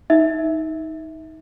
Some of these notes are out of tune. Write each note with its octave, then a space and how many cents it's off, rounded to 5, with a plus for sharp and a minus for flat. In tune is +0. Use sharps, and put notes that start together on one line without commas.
D#4 +20 E5 -10